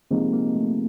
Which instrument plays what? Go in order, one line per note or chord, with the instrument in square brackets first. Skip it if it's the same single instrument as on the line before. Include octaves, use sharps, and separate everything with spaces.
[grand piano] C3 F3 G#3 C4 D#4 [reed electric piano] A#3
[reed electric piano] A#3
A3